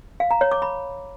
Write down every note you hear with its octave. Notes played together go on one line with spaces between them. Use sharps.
F5
A#5
C#5
D6
B5